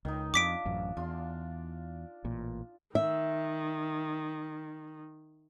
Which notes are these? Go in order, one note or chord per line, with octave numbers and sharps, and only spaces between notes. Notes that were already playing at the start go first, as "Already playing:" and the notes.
C#2 D#3 D#4
F2 D4 F4 D5 D6 B6 D7
A1 F#2
E2 D4 F4 C6
A1 A#2
D#3 E5